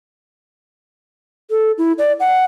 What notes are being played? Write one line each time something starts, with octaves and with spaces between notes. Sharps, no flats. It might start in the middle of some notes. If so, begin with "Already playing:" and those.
A4
E4
D5
F#5